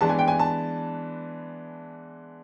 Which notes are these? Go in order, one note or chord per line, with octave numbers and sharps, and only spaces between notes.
E3 G#3 B3 D4 A5
G#5
G5
G#5
A5